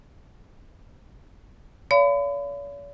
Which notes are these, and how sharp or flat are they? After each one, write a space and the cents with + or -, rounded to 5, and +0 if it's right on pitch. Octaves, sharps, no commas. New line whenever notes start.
C#5 +45 F5 -30 B5 +35